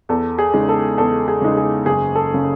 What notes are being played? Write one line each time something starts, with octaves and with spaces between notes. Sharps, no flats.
E2 A4
G#4
C#3 G#3 D#4
A4
E2 A4
G#4
C#3 G#3 D#4
G#4
F#1 G#4
A4
C#3